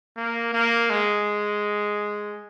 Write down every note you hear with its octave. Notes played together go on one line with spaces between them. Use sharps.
A#3
A#3
G#3